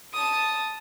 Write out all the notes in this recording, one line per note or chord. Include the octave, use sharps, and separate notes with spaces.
A5 D#6